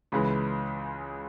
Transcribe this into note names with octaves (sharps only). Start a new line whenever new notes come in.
C#2 C#3 E3 G#3